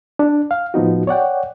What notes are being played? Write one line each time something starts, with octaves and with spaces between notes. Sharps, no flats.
D4
F5
A2 F3 B3 D#4 F#4
C#5 D5 F#5 G5